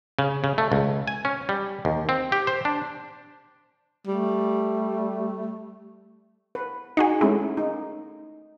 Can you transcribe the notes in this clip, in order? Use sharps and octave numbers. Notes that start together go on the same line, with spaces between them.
C#3
C#3
A3
C#2
G#5
C#4
G3
D#2
C4
G4
C5
D4
G3 A3
B4
D#4 F#4 G#4
G#3 A3 C#4 E4
D#4